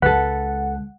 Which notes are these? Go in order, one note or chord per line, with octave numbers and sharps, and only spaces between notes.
C#2 G#3 A4 B4 F#5